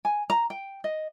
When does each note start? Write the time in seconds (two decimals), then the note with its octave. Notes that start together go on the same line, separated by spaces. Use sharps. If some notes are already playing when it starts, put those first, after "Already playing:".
0.05 G#5
0.30 A#5
0.50 G5
0.84 D#5